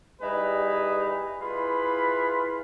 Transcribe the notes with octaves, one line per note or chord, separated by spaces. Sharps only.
G3 D#4 E4 G#4 B4
E4 F4 G#4 B4 B5